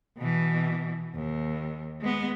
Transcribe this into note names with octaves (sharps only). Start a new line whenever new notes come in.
B2 E3
D#2
G#3 B3